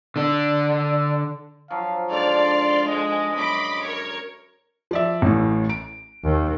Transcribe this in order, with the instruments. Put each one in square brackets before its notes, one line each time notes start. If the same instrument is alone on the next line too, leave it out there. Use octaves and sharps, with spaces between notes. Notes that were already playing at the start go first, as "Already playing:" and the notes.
[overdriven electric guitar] D3 D4
[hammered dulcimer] F3 F#3 [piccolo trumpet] F5
[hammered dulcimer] G#2 D3 [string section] D5 F6 [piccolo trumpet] C6
[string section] G#3 [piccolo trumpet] D#5
[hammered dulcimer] F#2 [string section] B5 C6 D6
[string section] A#4 C#5
[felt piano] F3 D5 E5
A1 A2
D7
[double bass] D#2